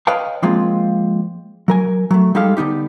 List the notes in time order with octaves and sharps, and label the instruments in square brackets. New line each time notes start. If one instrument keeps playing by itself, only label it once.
[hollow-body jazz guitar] B4 C#5 D#5 F5 G5 A5
F3 G#3 A#3 C4 F4
F#3 A#4 G#5
F#3 A3
G3 G#3 D#4 G4 A4 F5
D3 B3 D#4 G4